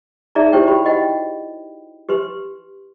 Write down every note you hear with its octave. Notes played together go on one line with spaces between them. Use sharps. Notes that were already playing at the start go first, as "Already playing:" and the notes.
D#4 G#4 D5 E5 A#5
E4 G4 C5 C#5 G5
F#4 G4 B5
D#5 F#5 G5 B5
G4 B4 C6